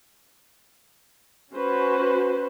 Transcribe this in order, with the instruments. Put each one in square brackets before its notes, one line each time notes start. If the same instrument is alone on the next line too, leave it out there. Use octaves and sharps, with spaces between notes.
[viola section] C#4 F#4 B4 C5